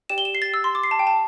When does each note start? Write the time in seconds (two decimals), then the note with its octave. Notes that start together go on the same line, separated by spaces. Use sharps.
0.10 G4 D5 G5 E7
0.18 G7
0.25 E7
0.35 C7
0.42 A6
0.54 E6
0.64 C6
0.75 D6
0.84 C7
0.91 A5
0.99 G5
1.07 A5